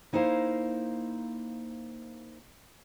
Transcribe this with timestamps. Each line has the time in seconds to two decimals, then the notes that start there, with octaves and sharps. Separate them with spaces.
0.13 A#3 D#4 E4 C5 F5